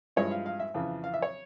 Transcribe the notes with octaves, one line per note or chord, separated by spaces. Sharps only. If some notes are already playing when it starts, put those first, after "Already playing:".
G2 F3 G#3 E4 C#5
F5
F5
E5
F2 C#3 E3
F5
E5
C#5